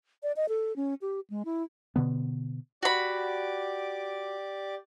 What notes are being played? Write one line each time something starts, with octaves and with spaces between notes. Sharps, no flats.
D5
D#5
A4
C#4
G4
G#3
E4
B2 D3 B3
F#4 G4 D5 B5 D6